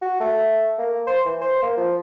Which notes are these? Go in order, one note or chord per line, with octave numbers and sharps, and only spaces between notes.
F#4
A3
A#3
C5
E3
C5
A#3
F3